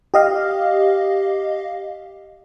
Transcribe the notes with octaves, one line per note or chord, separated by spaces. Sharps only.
G4 D#5 F5